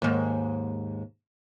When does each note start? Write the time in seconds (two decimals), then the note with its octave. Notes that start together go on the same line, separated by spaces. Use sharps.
0.02 D#2 G#2